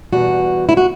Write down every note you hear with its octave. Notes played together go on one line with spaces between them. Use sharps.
E2 B2 G3 F#4
E4
F#4